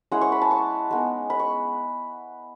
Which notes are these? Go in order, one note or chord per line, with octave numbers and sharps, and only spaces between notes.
G#3 C#4 E4 F#5
C#6
B5
A5
C#6
G#3 B3 D#4
B5
C#6